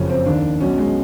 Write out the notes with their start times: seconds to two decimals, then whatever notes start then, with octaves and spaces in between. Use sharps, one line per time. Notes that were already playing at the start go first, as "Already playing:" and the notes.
Already playing: F#1 F2 C#3 F3 C#4
0.09 C4
0.26 D#2 D#3 D4
0.61 B1 B2 C#4
0.78 G#3